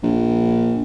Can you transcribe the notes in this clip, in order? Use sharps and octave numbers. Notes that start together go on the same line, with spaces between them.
A#1